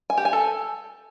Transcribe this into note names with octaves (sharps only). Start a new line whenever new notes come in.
G#5
G4
G#5
A4